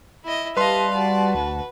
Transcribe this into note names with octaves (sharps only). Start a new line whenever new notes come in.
E4 D#5
G3 B4 D#5 F5 A5 C6
F#4 D5 A5
D2 B4